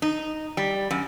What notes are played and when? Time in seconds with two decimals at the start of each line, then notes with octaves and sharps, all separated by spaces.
0.02 D#4
0.57 G3
0.91 F#2